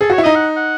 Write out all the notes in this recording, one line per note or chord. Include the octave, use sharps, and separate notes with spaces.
G#4 A4
F#4 C#5
E4
D#4 D#5
F#5
F#5